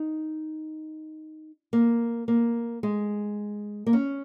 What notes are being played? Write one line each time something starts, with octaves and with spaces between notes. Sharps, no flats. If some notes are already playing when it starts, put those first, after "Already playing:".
Already playing: D#4
A#3
A#3
G#3
A#3
C#4